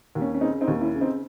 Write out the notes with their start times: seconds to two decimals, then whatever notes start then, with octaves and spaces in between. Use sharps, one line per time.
0.15 D#2
0.22 C#4
0.34 C#4
0.41 C#3 C4 D#4
0.61 C4 D#4
0.68 D#2
0.81 C#4 E4
0.95 C#3
1.01 C4 D#4